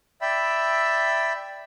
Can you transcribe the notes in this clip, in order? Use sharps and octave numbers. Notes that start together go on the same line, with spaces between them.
D5 E5 G5 B5 E6